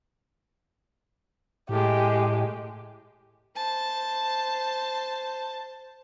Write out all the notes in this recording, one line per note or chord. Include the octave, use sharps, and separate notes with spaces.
A2 G#3 G4
C5 A5